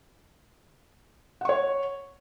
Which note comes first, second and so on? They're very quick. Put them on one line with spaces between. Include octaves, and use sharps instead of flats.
F#5 C#6 C#5